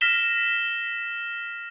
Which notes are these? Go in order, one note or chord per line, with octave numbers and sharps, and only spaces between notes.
F6 A#6 B6 E7 G7